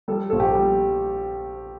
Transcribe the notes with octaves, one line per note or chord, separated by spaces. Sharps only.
G3 A4
A#1 A4
G4
G3